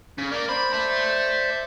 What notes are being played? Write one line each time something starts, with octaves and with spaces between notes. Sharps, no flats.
C#3
A#3 D5
C5 D5 B5
E5 A5